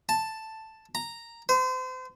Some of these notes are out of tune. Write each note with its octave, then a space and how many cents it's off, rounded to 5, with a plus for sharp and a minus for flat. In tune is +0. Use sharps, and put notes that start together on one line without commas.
A5 +5
A#5 -5
C5 -35